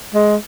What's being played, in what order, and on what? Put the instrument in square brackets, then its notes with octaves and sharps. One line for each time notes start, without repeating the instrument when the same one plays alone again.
[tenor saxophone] G#3